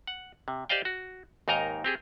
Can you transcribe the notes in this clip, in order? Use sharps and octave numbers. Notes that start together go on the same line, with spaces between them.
F#5
C3
G4 C5 D5 D#5 F5 G5
F#4
D#2 G#2 D#4 A#4 D#5 A#5
C4 G4 G#4